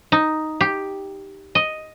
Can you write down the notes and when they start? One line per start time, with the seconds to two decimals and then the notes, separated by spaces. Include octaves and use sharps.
0.12 D#4
0.61 G4
1.55 D#5